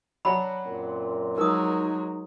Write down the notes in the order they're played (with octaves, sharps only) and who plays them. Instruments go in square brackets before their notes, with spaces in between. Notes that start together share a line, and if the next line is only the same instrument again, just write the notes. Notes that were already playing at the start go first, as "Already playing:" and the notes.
[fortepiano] F#3 D4 F#4 [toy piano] B5
[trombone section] F#2 A#2 C4
[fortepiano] F3 E6 [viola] F#3 G#3 [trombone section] D#4 [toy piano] A#4 D#6